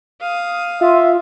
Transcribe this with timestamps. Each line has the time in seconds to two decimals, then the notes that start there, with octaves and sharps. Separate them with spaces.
0.21 F5 D#6
0.81 F4 E5